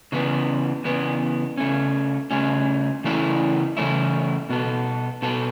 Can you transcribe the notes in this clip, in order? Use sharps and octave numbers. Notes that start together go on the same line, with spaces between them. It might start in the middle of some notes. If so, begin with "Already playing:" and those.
C#3 E3 B3
C#3 E3 B3
C#3 A3 C#4
C#3 A3 C#4
C#3 E3 A3 C#4 E4
C#3 E3 A3 C#4 E4
B2 B3 A4
B2 B3 A4